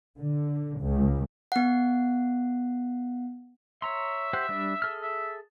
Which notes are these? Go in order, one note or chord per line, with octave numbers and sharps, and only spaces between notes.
D3
C#2
B3 F#5
C#5 E5 A#5 C6
G4 C5 F#5
G3 D4
G#4 A4 F6
E5